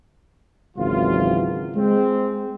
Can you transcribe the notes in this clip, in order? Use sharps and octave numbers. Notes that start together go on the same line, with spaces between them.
G#1 C#2 E3 F#3 F4
G#3 C4